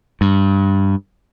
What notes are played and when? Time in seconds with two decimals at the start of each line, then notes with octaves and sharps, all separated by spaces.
0.21 G2